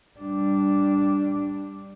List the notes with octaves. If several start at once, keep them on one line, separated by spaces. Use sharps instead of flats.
G3 D4